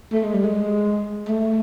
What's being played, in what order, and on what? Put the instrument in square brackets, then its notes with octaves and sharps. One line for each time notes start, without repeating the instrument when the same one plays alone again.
[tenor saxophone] A3
G#3
G3
G#3
A3